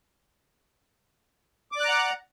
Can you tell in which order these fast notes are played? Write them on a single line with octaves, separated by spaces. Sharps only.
D6 D5 F#6 A#5 F#5